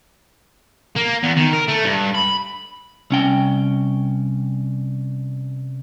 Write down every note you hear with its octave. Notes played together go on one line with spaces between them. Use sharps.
A#3
E2
D#3
A#4
A3
G2
B5
C2 C#4 G5